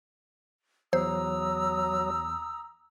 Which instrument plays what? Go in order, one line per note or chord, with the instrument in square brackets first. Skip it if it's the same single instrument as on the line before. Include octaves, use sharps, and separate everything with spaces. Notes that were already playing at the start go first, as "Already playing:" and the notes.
[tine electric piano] E2 [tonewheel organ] F#3 [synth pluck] C5 [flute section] A#5 D#6 E6